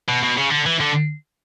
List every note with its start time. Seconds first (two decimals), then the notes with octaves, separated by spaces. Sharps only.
0.08 B2
0.23 B2
0.37 C#3
0.51 D3
0.66 E3
0.80 D3